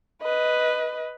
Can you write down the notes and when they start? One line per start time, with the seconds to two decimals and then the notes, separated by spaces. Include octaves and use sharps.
0.22 B4 D#5